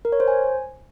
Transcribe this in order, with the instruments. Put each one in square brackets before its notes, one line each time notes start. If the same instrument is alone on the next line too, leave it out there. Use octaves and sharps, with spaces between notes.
[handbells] A#4
C#5
C5
G#5